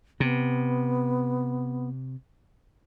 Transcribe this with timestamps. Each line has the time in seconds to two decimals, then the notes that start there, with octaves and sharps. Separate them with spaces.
0.20 C3 B3